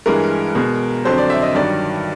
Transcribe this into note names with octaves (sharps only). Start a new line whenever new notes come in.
G2 E3 G#3 A#4
B2 G#3
F2 D3 F#3 C5
D5
E5
D#5
G2 D#3 F#3 D5